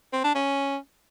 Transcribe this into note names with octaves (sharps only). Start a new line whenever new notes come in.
C4
D4
C#4